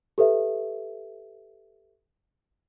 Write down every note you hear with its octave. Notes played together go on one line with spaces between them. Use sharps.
G4 A4 B4 E5